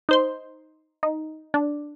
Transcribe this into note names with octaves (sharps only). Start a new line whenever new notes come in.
D#4 C5 C6
D#4
D4